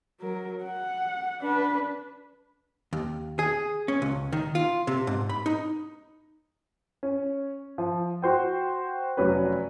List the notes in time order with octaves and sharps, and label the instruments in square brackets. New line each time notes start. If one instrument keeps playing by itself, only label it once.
[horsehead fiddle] F#3 A#4
F#5
D4 B4
[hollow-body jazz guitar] D#2
G#4
C#4
C#2
D#3
F4
C3
G#2
B5
D#4
[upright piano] C#4
F3
F#4 C5 G5
F1 F#3 C#4 B4